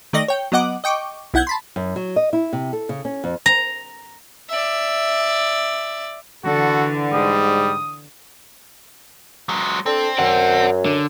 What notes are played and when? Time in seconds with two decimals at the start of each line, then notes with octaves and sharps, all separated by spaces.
0.13 D#3 A3 D5 D#5 A#6
0.28 C#5 G5
0.52 F#3 B3 D#5 F#5 D6
0.84 D#5 G5 C#6 D6
1.34 B1 E4 F#5 G6 G#6
1.47 A5 B5 C6
1.76 F#2
1.96 F#3
2.16 D#5
2.33 E4
2.53 C3
2.73 A4
2.89 C#3
3.05 C#4
3.24 F2
3.46 A#5
4.50 D5 E5
6.45 D3 E3 F#4 A4
7.13 G#2 G3 D#6
9.49 F#3 G#3
9.86 C4 D4 A4
10.19 F#2 D5 F#5
10.86 D3